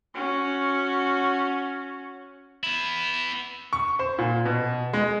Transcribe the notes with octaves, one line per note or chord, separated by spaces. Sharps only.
C#4 F#4
B3 E4
C#6
C5
A#2
B2
G#3